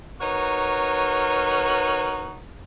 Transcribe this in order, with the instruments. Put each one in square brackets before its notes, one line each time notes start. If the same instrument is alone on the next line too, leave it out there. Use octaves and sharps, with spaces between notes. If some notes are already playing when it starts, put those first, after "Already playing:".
[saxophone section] D#4 F#4 A#4 B4 C#5